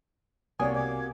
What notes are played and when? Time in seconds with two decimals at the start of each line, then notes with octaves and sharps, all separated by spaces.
0.59 C2 C3 A#3 F#4 C#5 D5 G#5 D#6
0.75 D6 G#6